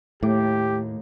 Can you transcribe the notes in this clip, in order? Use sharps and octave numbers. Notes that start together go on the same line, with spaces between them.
D#2 A2 A3 G4 D6